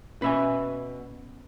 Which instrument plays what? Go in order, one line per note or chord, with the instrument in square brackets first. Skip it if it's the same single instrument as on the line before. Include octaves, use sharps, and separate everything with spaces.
[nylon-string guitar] B2 [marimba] C#4 [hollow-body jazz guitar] B4 E5 G#5